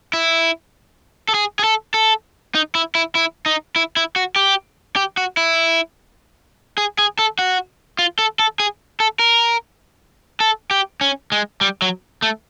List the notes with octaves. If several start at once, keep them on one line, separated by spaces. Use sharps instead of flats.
E4
A4
G#4
G#4
A4
A4
D#4
E4
E4
E4
D#4
E4
E4
F#4
G4
G4
F#4
E4
G#4
G#4
A4
F#4
F4
A4
A4
G#4
A4
A#4
A4
G4
C#4
G#3
G3
F#3
A3